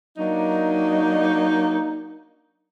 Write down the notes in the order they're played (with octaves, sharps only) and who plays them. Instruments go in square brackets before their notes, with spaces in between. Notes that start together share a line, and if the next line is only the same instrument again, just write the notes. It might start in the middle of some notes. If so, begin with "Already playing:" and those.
[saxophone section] F#3 A#3 D4 D#4